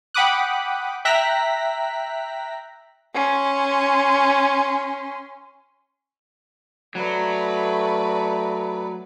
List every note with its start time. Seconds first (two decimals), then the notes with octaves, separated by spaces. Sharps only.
0.14 F#5 G5 B5 D6 D#6 F#6
1.05 E5 G5 A#5 F#6 A#6 B6
3.14 C#4 C6
6.95 F#3 A3 B4 D5